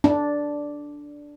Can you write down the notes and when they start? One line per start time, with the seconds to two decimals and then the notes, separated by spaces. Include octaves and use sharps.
0.04 D4